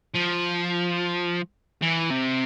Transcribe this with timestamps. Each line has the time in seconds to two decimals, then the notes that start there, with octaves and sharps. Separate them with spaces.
0.15 F3
1.83 E3
2.10 C3